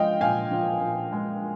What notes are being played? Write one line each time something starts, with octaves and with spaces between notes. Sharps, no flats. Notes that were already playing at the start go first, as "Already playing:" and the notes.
Already playing: F3 G#3 D#5 F5 G5
A#2 F5 G#5
F3
A#2
G#3